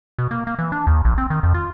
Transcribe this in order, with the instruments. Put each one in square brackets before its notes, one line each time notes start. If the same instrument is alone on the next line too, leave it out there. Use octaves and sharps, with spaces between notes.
[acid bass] B2
A#3
A#3
E3
D4
D#2
A#1
C4
D#3
F2
F4